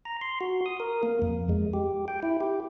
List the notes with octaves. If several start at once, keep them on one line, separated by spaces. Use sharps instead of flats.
A#5
C6
F#4
D#6
A#4
A#3
F2
G#3
G4
G5
E4
G4